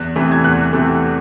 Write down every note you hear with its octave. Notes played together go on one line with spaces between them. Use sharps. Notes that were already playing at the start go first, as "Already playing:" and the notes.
Already playing: E2 F#6
C3 E3 A3
G#6
E2 F#6
C3 E3 A3